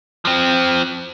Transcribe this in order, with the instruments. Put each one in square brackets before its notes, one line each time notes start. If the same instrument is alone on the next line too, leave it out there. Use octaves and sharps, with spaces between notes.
[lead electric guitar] F3 C4